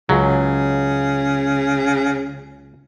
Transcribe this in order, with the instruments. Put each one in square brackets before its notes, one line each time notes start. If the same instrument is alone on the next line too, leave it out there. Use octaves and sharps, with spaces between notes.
[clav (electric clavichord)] C#2 F#3 [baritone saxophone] C#3